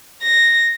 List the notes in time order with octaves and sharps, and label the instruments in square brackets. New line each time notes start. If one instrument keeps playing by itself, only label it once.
[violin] A#6